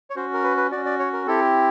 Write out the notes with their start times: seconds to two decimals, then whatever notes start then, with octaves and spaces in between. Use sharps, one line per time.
0.10 C#5
0.16 C#4 F#4 C5
0.34 A#4
0.44 B4
0.57 B4
0.72 C#4 F#4 D5
0.85 D5
0.99 C#5
1.13 A#4
1.27 C4 E4 G4 A4